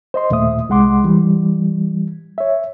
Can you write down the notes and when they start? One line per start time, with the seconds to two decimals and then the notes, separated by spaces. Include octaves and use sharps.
0.14 C5 D#5 C6
0.30 D#2 A#2 A3 E5 D#6
0.69 C2 G#3 F#5 C6 D6
1.04 E3 G3
2.38 C#5 E5